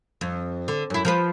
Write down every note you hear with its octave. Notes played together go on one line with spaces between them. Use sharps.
F2
D3
F#2 E4
F3 A#4 B4